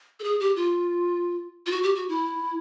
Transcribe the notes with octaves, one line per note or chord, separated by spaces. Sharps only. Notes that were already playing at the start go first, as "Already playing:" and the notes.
A4
G#4
G4
F4
F4
F#4
G4
F#4
E4